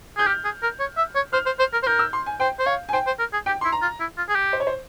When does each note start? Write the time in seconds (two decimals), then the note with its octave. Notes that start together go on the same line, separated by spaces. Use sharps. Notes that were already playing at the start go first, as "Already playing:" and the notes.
0.17 G#4 G6
0.27 G4 F6
0.44 G#4
0.63 A#4
0.80 C#5
0.97 E5
1.15 C#5
1.33 C5 F6
1.46 C5
1.59 C5
1.73 A#4
1.83 C5
1.87 A#4 G6
1.99 E6
2.13 C6
2.26 G#5
2.40 C5 G5
2.59 C5
2.66 C#5 F5
2.89 G#5
2.93 C5 G5
3.07 C5
3.19 A#4
3.33 G#4
3.46 G4 G5
3.61 E4 C6
3.72 A#5
3.82 F4
4.00 E4
4.17 F4
4.28 G#4
4.35 G4
4.53 C5
4.60 C#5
4.67 C5